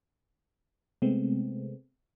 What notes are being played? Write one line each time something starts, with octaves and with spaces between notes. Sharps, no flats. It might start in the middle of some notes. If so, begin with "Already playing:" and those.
C3 G#3 A3 B3 C4